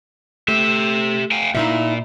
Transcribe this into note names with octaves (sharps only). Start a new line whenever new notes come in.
A3 G4 E5
F5 G5 G#5
A#2 D#4 E4 E5